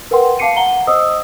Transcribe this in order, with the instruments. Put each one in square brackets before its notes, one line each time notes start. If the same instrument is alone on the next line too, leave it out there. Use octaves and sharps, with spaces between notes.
[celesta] A#4 B4 F#5 G5 C6
F5 A5 D6 C7 C#7 D#7
F#5 A#5 G7
C5 D#5 D#6 E6